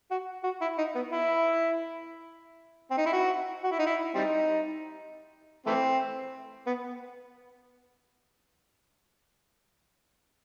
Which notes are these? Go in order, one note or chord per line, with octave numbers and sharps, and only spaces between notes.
F#4
F#4
E4
D#4
B3
E4
C4
D#4
E4
F#4
F#4
E4
D#4
E4
G3 C4 D#4
E3 A3 C4
B3